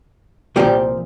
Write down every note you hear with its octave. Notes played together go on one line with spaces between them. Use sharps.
C2 A#2 F3 G3 G4